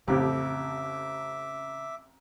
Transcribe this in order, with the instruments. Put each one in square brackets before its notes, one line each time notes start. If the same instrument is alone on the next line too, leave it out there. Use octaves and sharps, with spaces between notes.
[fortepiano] A1 F2 G4 [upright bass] C#3 [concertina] E5 D6